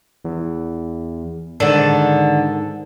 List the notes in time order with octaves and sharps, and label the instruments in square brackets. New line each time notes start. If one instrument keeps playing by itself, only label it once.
[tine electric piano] E2
[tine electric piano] G#2 A4 [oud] D3 D#3 D4